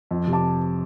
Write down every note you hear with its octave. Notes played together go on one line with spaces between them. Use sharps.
F2
C3
A5 D6